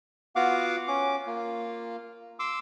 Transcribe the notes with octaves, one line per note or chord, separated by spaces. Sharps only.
B3 F4 F#4 F5 F#5 D6
C#4 D6
A#3 F4
C6 D6 E6